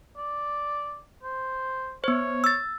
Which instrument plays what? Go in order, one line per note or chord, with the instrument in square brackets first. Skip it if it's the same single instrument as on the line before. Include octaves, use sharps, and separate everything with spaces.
[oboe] D5
C5
[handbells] B3 C5 [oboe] C#5
[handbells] E6 A6